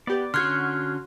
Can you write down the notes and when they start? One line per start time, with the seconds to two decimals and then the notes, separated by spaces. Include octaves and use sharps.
0.07 B3 G4 B4 D5
0.34 D3 C#4 F#4 C6 F6 F#6 G#6